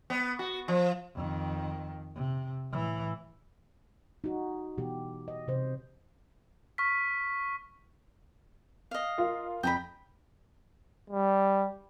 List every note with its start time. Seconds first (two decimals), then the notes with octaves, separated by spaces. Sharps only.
0.10 B3
0.39 F#4
0.68 F3
1.15 F2 D#3
2.15 C3
2.71 A2 E3
4.24 D#4 F#4
4.78 B2 E3 G4
5.28 D#5
5.48 C3 C5
6.78 C#6 F6 B6
8.91 D#5 F5
9.18 F4 A#4
9.63 F2 G5 A#5 B5
11.10 G3